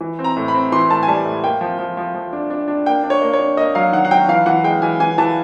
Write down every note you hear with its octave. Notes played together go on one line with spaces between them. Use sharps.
E3
C4
A#5
A2
B5
C4
E3 C6
A2 A5
G#5
G3 A5
A2
A#3 G5
F3
F3
F3
F3
D4
D4
D4
A#3 G5
D4
C#5
A#3
C#5
D4
A#3 D#5
F#3 F5
D#3 F#5
F#5
F#3 G5
E3 F5
E3 F#5
G#3 G5
E3 G#5
E3 G#5
E3 A5